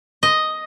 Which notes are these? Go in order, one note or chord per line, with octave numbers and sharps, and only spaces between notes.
D#5